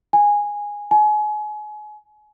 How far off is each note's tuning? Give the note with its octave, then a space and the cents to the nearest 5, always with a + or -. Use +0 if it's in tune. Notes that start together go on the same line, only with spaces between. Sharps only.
G#5 -10
G#5 +30